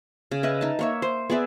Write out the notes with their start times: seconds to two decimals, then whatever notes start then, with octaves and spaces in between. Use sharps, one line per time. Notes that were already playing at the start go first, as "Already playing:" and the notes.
0.31 C#3
0.43 B4 D#5 E5
0.61 D#4 A5
0.79 A#3 C#5 E5
1.02 C5
1.30 B3 G#4 D5 E5